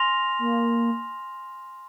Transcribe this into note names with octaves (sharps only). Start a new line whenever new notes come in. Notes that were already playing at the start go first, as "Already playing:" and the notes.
Already playing: G#5 C6 F6 A#6 F7
A#3